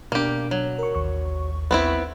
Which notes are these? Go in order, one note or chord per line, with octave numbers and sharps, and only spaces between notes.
B2 A#3 D4 G4
F#3
A#4 C#6
A1 D#2 C#6
B3 C4 E4